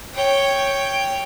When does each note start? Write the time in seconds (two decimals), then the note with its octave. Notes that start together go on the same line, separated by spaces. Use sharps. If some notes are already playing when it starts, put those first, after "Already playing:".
0.13 C#5 G5